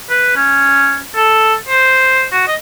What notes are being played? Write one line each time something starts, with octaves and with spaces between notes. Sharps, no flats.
B4
C#4
A4
C5
F#4
D#5